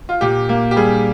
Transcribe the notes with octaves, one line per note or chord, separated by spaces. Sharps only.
F4
A#2 G4
A#3
G4
G3 G#4